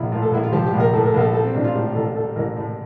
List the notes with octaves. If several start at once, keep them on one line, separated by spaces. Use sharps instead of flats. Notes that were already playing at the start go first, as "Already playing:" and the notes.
Already playing: A#1 E4 F4
A2 F4
A4
A#1 E4
F4
F3 G4
G4
A#1
A#4
A2 A4
A#4
A4
A#1 A#4
A4
G3 A4
C4
A1 D4
F4
A2 G4
A1 A4
G3 A4
A1 A#4
A2